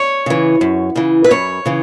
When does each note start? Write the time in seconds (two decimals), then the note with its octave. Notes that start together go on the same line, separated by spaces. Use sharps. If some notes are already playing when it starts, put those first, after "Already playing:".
Already playing: C#5
0.26 C#3 E3
0.61 F#2
0.96 C#3 E3
1.24 B4
1.31 F#2 C#5
1.66 C#3 E3